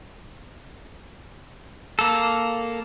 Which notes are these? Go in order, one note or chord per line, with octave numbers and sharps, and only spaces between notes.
A#3 A4